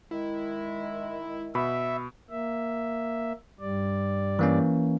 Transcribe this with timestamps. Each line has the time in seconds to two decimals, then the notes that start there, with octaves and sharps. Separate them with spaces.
0.11 D#3 G#3 E4
1.55 B2 E5 B5
2.30 A#3 E5
3.60 G2 G3 D5
4.39 E3 A#3 C#4